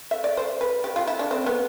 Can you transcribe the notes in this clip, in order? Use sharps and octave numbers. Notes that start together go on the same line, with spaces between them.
E5
D5
C5
B4
G4
F4
E4
D4
C4
B3